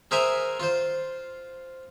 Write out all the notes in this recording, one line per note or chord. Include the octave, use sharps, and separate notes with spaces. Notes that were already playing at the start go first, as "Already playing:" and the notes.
G#4 A#4 C5 E5 G#5 A#5
F4 C5